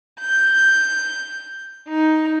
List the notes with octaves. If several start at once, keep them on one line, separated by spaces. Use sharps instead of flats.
G6
D#4